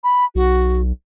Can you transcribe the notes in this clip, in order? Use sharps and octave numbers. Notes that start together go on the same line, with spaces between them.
B5
B1 F#4